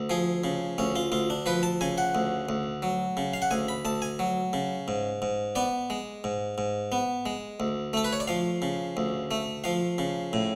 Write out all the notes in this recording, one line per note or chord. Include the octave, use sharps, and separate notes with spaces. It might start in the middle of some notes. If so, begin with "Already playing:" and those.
Already playing: D2
F3 G#4
C#3
D2 C#4
F4
D2 F4
D4
F3 B4
A5
C#3 G#5
F#5
D2
D2
F#3
C#3
F5
F#5
D2 G#5
B5
D2 A5
G#5
F#3
C#3
G#2
G#2
B3 D5
G#3
G#2
G#2
B3
G#3
D2
A3 A4
B4
C#5
D5
F3 F5
C#3
D2
A3
F3 F5
C#3
A2